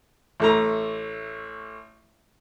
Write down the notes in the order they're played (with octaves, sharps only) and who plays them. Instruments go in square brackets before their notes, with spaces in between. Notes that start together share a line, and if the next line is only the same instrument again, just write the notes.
[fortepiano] A1 A3 A#5